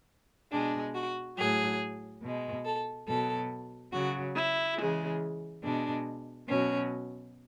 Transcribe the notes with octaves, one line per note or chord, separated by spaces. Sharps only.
B2 G#3 D4
F#4
A2 F#3 G#4
B2 G#3
A4
B2 F#3 A4
C#3 F#3 F#4
E4
C#3 E3 G#3
B2 G#3 D4
B2 F#3 C#4